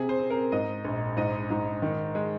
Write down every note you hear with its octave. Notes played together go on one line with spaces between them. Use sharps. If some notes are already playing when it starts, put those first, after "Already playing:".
Already playing: C3 G#4
C5
C4
A#4
G#2 D#5
A#1
G#2 D#5
G#2
D#3
G#3